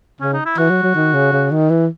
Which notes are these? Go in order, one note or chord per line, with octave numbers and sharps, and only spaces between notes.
C#3 C#4
D#4
E4
E3 F#4
F#3
F#3
D#3
C#3
C#3
D#3
E3